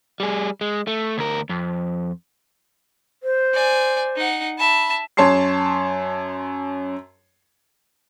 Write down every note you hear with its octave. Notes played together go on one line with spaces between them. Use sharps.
G3 G#4
G#3
A3
D2 A#4
F2
C5
D5 G#5
D#4 F#5
E5 A5 B5
F#2 C#5 A5 C6 C7